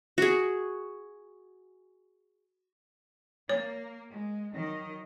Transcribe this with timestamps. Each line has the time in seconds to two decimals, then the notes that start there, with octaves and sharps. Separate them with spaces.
0.18 F#4 G#4
3.49 A#3 C#5
4.11 G#3
4.54 D#3 F#3 D#5